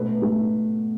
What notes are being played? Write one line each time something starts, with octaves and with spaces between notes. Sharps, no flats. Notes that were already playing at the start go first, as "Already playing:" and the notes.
Already playing: B2 A3 B4
A3